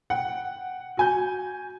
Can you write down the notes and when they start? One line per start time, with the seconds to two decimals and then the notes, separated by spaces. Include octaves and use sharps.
0.10 F#5 G5
0.97 F#4 G#5 G6